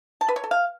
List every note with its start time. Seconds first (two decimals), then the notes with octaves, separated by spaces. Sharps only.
0.21 A5
0.28 B4
0.36 C#5
0.44 A4
0.51 F5